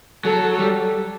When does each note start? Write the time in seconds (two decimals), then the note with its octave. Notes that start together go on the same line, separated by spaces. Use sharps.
0.25 F#3 A4
0.59 G3